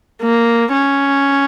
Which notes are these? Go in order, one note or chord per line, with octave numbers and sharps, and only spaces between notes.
A#3
C#4